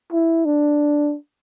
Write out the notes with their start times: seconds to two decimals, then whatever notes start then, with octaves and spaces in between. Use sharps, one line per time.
0.12 E4
0.45 D4